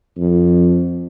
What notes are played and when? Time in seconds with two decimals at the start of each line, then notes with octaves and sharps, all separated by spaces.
0.17 F2